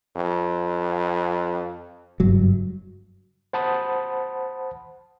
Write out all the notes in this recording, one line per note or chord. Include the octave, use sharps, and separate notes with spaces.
F2
F#1 G2 F#3
C5 F#5 A5 B5 D#6